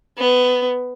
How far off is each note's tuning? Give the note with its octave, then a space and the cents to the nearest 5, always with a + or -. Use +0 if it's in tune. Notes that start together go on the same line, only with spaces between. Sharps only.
B3 +15